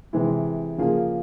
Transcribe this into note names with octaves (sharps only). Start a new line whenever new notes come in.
C3 E3 G#3 E4
C#3 F3 A#3 F4 G#4